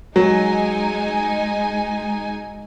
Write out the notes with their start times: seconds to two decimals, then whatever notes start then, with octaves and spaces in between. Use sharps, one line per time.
0.16 F#3 G#3 D#4 G#5